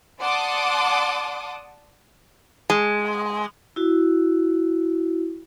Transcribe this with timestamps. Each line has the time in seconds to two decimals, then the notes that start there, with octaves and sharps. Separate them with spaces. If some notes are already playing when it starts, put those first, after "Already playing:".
0.20 D5 F#5 A5 C6 D6 D#6
2.70 G#3
3.76 E4 F#4